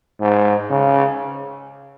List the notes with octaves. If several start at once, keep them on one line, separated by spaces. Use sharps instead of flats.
G#2
C#3